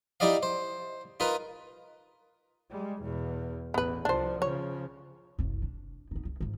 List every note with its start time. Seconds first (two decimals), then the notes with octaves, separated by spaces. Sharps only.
0.20 D#4 E4 G4 D5 D#5 F5
0.43 C5
1.20 D#4 F4 A#4 B4
2.71 G3 G#3
3.02 E2 B2
3.74 A1 E2 B3 B4
4.05 C2 F3 D4 C5
4.42 C#3 F3 C#5
5.39 F#1 C2
5.63 D4
6.11 B3 D#4
6.25 C#2
6.40 F2 G#2